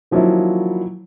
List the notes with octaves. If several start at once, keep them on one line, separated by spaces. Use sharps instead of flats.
D#3 F3 F#3 A#3 C#4 E4